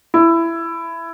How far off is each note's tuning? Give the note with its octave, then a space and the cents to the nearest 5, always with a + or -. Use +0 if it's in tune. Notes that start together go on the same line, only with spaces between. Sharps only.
E4 +15